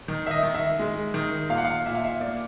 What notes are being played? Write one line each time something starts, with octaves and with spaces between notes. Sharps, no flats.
D#3
E5
D#5
D#3
E5
G#3
D#3
A#2 F5
F#5
F5
A#2 E5
F5
E5
A#3 D5